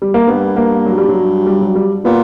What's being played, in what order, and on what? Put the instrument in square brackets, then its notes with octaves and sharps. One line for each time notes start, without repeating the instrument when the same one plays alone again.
[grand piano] G3
A#3
[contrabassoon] G2 [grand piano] B3
[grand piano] A#3
F#3
G3
F#3
G3
F#3
G3
[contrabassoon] A#2 [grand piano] B3